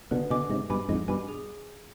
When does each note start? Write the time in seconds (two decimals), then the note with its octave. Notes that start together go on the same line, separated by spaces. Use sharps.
0.11 B2 D3 B4
0.30 B2 D3 D#5 G#5 D6
0.49 G#2 C3 D#5
0.70 G2 B2 G#5 B5 D6
0.89 F2 G#2 D#5
1.08 G2 B2 G#5 B5 D6
1.28 G#4